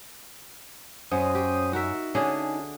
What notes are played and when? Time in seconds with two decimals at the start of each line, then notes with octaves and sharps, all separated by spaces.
1.12 F#2 C#4 C5 D#6
1.35 G4
1.73 D#4 F#4 A#4 E5
2.15 D3 C#4 D4 G#4